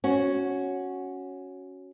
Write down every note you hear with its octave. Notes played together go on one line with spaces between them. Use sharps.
C#4 F#4